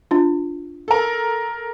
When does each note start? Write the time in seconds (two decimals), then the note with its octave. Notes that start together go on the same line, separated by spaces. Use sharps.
0.11 D4 F4
0.88 A4 A#4